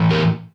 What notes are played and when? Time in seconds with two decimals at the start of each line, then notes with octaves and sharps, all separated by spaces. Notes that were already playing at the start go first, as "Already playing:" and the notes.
Already playing: A2 E3 A3
0.10 G4 A#4